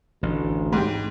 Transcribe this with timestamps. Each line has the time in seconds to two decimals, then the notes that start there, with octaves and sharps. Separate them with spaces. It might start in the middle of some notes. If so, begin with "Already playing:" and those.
0.23 A1 D2
0.73 G#2 G4